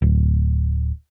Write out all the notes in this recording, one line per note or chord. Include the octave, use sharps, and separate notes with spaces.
D1